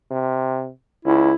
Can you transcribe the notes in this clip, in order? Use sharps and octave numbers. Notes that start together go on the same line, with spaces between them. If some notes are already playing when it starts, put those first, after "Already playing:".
C3
C#2 E4